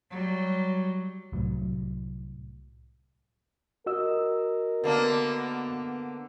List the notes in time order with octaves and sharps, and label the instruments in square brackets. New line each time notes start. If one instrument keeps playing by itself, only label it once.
[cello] F#3 G3
[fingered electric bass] C2 A2 F#3
[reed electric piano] F#4 D#5 E6 [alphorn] A#4
[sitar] D3 A#3 D4 [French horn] B3